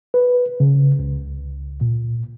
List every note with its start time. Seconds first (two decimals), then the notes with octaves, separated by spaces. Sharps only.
0.14 B4
0.60 C#3
0.99 C#2
1.81 A#2